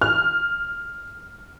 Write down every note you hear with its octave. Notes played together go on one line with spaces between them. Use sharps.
F6